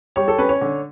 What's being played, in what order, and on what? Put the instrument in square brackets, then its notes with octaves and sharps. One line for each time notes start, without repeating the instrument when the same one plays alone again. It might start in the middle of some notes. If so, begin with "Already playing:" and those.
[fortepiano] G3 [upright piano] C#5
[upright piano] A4
[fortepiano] C#4 [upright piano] B4
[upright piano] C#5
[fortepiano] D3